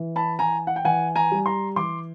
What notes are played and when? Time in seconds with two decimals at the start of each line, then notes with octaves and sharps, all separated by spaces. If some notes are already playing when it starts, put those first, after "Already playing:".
Already playing: E3
0.16 A5 B5
0.39 E3 G#5 A#5
0.67 F#5
0.76 G5
0.85 E3 F#5 G#5
1.15 G#5 A#5
1.32 G3
1.46 A#5 C6
1.76 E3 C6 D6